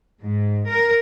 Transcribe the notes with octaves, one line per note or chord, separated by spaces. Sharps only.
G#2
A#4